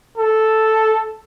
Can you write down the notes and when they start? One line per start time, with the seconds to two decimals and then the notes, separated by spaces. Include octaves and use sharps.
0.18 A4